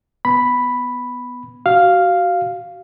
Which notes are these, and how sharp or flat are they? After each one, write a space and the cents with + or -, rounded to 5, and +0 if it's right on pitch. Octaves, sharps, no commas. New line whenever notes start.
B3 +0 B5 +0
F#4 +25 F5 +0